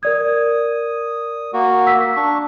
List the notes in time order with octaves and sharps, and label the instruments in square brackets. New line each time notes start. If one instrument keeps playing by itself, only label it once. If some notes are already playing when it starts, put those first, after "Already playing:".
[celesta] A#4 D5 G#6 [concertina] D#6
[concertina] A#3 F#4
[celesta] E6 B6
[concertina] D4 C#6